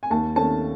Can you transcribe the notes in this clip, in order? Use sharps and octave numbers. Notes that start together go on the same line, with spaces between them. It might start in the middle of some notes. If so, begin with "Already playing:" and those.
G#5
D#2 A5
D#3 A3 C#4 A5